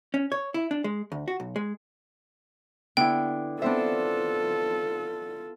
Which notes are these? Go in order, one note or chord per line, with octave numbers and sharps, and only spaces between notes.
C#4
C#5
E4
D4
G#3
D2
F#4
B1
G#3
D3 B3 E4 G5
B3 C4 D4 F4 A4 C5 E5